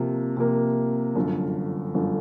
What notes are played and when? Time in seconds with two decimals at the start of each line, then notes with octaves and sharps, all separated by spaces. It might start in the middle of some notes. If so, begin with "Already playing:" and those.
Already playing: C3 F3 A#3
0.37 C3 F3 A#3
1.15 G1 F#2 D3 F3
1.94 G1 F#2 D3 F3